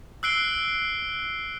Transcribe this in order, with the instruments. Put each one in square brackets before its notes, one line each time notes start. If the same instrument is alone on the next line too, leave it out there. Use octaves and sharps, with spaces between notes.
[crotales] E6 F#6 C7 D7 G7